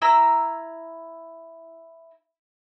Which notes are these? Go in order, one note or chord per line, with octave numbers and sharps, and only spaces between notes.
E4 A#5 E6